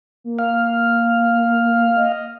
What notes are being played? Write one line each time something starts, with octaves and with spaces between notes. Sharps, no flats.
A#3
F5
D#5